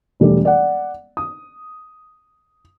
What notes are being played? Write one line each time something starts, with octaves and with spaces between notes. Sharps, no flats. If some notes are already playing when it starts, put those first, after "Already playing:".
E1 G3 A3 D4 D5
D5 F#5
D#6